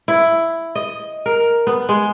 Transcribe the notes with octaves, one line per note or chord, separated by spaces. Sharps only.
E4
D#5
A#4
B3
G#3